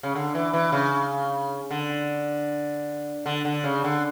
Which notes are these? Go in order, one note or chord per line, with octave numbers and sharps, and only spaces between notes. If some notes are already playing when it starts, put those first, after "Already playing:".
C#3
D3
E3
E3
C#3
D3
D3
D3
C#3
D3